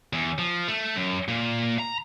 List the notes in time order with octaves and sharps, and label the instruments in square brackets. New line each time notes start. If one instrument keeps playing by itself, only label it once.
[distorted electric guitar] E2
F3
A3
F#2
A#2
A#5